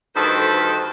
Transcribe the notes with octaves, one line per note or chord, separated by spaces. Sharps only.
D2 G2 D#3 A4 B4 C5